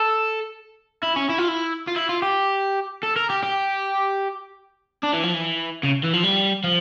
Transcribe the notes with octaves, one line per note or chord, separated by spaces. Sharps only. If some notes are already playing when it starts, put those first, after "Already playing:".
Already playing: A4
E4
C#4
E4
F4
E4
F4
E4
F4
G4
A4
A#4
G4
G4
D4
E3
F3
E3
C#3
E3
F3
G3
F3